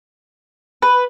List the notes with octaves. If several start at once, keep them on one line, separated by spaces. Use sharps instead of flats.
B4